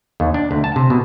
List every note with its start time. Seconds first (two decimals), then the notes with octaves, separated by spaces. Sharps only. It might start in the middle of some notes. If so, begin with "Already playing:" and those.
0.20 D#2
0.34 D4
0.51 D2
0.64 A5
0.76 C3
0.90 B2